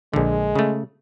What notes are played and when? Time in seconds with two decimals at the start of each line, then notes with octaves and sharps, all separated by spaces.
0.14 A#1 D3 G#3
0.55 C#3 A3